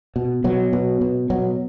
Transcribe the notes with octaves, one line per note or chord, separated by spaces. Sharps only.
B2
B2 F#3
B2
B2
B2 F#3